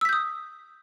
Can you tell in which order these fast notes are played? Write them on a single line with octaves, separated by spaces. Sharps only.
E6 B6 G6 D#6